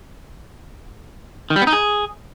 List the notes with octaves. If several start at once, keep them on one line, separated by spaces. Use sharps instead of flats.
D#3
G3
B3
D#4
G#4